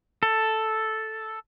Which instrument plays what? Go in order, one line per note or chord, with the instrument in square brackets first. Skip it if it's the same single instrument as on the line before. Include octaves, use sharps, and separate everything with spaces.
[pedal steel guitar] A4